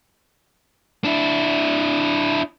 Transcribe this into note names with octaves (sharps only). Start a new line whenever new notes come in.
D4 E4